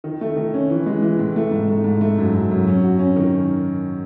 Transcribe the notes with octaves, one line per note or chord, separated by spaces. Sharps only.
D#3
A3
D#3
C#4
E3
G#3
E3
A2
A3
G#2
A3
G#2
A3
F#2
F#2
F#2
C#4
F#4
C#4
D#3